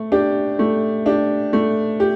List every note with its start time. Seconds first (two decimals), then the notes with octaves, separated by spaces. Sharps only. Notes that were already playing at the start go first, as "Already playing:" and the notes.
Already playing: A3
0.12 D4 G4
0.59 A3
1.06 D4 G4
1.53 A3
2.00 G4